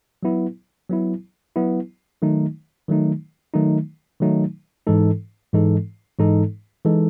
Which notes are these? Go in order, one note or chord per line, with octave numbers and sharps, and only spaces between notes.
F#3 B3 E4
F#3 B3 E4
F#3 B3 E4
D#3 F#3 A3 D#4
D#3 F#3 A3 D#4
D#3 F#3 A3 D#4
D#3 F#3 A3 D#4
G#2 E3 G#3 D#4 A4
G#2 E3 G#3 D#4 A4
G#2 E3 G#3 D#4 A4
E3 G#3 D#4 A4